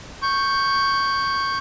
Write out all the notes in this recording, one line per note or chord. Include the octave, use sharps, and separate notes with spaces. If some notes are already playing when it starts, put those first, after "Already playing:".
C#6 G6